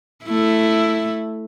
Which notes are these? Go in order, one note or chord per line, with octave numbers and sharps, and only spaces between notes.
A3 E4